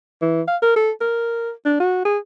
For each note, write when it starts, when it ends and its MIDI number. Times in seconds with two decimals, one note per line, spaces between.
0.22 0.42 52
0.48 0.57 77
0.62 0.74 70
0.76 0.91 69
1.01 1.51 70
1.65 1.79 62
1.80 2.03 66
2.05 2.18 68